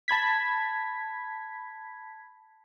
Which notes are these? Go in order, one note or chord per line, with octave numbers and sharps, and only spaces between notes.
A5 B5 G#6 B6